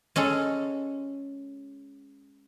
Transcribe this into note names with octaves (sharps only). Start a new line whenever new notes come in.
G#3 C#4 G#4 A4